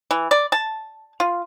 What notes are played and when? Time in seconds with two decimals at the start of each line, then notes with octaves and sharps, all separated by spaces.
0.11 E3
0.31 D5
0.52 A5
1.20 F4